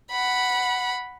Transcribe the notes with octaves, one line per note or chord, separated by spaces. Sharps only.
F#5 B5